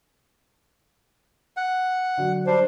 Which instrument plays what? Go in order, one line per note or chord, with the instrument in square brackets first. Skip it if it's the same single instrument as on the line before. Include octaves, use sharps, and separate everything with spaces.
[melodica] F#5
[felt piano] D3 F#3
[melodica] G3 D4 [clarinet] C5